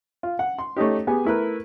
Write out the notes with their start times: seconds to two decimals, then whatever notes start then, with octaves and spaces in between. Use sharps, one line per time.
0.23 F4
0.39 F#5
0.58 C6
0.76 A3 C#4 D#4 G4
1.07 B3 G4 G#4 G#5
1.25 A3 E4 A#4 B4